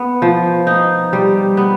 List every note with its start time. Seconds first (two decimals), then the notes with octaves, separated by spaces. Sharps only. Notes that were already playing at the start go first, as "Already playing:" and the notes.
Already playing: B3
0.22 F3
0.67 D#4
1.13 G3
1.57 B3